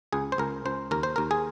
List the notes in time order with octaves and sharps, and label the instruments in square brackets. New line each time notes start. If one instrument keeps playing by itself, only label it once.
[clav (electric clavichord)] C#2 G#4
C5
C#2 A#4
C#2 C5
D#2 A#4
C5
D#2 A#4
G#4